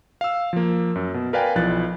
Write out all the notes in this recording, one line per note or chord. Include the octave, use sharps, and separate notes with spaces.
F5 E6
F3 A#3
F#2
B2
A#4 B4 D5 F5 G5 G#5
B1 E3 F3 F#6 A6